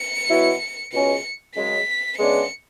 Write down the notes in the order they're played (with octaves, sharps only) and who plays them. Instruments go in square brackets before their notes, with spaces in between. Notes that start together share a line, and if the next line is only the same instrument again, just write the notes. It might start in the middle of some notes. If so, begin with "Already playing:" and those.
Already playing: [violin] C#7
[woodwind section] B2 F#3 B3 E4
[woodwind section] C#2 B2 G#3 C#4 [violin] C#7
[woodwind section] F#2 C#3 G#3 [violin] B6
[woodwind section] C#3 G#3 B3 D4 [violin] C#7